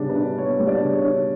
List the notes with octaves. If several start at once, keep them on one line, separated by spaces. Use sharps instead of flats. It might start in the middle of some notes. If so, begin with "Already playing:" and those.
Already playing: C#3 G3 B3 D4 D5
B4
D4
B3 C#5
G3
D4 D5
C#3
C#5
D4